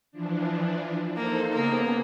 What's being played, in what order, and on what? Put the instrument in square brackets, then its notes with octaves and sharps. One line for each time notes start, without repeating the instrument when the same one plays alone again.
[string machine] E3 F3 D4
[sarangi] A#3 [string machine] D#4 A4 C5
[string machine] C#3 B3 G#4 [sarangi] A#3